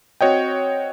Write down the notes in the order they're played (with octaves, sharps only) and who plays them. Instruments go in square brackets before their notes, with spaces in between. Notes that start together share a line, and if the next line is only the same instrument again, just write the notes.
[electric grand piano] C4 F#4 C#5 D#5 G5